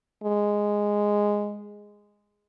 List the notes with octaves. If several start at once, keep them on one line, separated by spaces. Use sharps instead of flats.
G#3